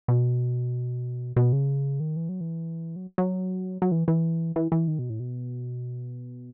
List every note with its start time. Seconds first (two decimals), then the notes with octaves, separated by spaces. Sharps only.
0.08 B2
1.36 B2
1.52 C#3
2.00 D#3
2.16 E3
2.29 F#3
2.41 E3
2.96 F#3
3.18 F#3
3.82 F#3
3.92 E3
4.08 E3
4.56 E3
4.72 E3
4.88 D#3
4.99 B2
5.10 A2
5.20 B2